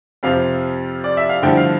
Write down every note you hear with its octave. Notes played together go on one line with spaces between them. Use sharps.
F2 C3 F3 F5
D5
E5
F5
G2 D3 F3 A3 E4 G5
F5